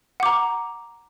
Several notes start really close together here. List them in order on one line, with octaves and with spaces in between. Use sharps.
F#5 D6 A#5